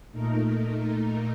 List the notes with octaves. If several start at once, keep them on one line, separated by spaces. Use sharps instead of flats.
A#2 A3 D#4 A#4